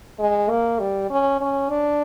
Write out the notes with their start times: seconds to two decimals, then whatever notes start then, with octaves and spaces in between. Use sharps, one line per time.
0.19 G#3
0.50 A#3
0.79 G3
1.10 C#4
1.41 C#4
1.70 D4